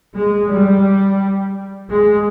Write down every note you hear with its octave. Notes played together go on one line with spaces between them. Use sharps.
G#3
G3
G#3